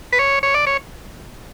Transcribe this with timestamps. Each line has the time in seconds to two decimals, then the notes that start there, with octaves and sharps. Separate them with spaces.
0.13 B4
0.19 C#5
0.43 C#5
0.54 D5
0.67 C#5